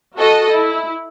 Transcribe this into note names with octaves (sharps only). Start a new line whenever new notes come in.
F#4 A4 D#5
E4